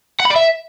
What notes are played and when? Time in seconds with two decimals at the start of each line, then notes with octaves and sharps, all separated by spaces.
0.20 F#5
0.25 B5
0.31 D5
0.36 E5